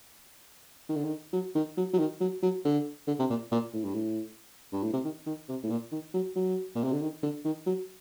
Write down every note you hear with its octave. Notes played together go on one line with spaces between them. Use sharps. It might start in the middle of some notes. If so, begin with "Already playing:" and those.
D#3
D3
D#3
F#3
D#3
F#3
F#3
D#3
F#3
F#3
D3
D3
C3
A#2
A#2
A2
G2
A2
G2
A2
C3
D#3
D#3
C3
A2
A#2
D#3
F#3
F#3
A#2
C3
D3
D#3
D3
D#3
F#3